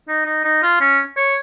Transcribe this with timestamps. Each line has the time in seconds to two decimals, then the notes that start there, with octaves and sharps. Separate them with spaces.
0.08 D#4
0.26 D#4
0.44 D#4
0.63 F4
0.81 C#4
1.17 C#5